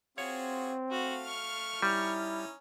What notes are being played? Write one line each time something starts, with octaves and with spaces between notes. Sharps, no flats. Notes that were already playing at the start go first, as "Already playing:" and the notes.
C4 F4 F#4 G#4 C#5
A3 F#4 F5
C#6 F6
G3 C#4 D#4 E4